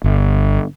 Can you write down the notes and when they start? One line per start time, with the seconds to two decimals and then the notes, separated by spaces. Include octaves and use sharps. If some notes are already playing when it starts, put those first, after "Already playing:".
0.04 G1